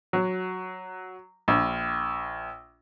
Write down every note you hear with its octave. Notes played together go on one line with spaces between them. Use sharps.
F#3
A#1